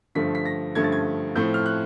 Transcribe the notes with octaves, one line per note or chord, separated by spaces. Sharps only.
G2 D3 F3 A3 B6
B6
A#6
G2 D3 F3 A3 G#6
A6
G#6
A2 F3 A3 C4 G6
F6
F#6